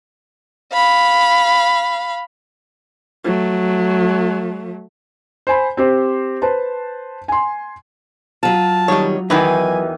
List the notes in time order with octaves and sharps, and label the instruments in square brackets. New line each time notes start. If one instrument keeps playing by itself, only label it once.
[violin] F5 B5
[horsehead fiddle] F#3 A3
[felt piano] C5 G#5 B5
C4 G4 C5
B4 C5 A5
G#5 C6
[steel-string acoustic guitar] F#3 F4 [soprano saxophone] A5
[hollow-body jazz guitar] D#3 G3 [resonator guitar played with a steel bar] C#5 D#5
[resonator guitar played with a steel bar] E2 D#3 E3 [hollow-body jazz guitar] D#4 B4 [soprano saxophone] G#5